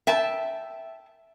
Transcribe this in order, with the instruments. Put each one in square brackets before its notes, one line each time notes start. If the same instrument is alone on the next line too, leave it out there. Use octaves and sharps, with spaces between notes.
[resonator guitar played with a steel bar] E5 G5 A5